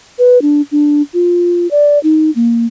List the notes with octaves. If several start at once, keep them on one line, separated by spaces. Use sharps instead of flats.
B4
D4
D4
F4
D5
D#4
A#3